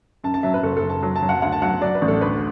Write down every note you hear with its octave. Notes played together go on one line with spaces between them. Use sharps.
F#2 A5
A5
F#3 E5
B4
F#1 A4
A4
F#1
A5
F#3
A5
F#3
F#5
D2 F#5
A5
F#3 F#5
F#3 D5
B4
A1
A4
D2 B4